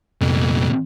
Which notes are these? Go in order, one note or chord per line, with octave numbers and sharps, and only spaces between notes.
C2 F2 A#2